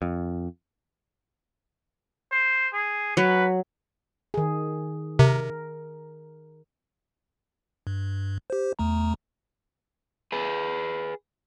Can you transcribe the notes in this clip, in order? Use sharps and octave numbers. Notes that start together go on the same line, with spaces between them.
F2
C5
G#4
F#3 B4
D#3 G#4
C3 A#4
G2
G4 C5
E2 A3 A#5
G#4 B4